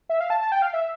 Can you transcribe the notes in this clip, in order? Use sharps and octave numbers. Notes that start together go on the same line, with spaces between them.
E5
F5
A5
A5
G5
F5
E5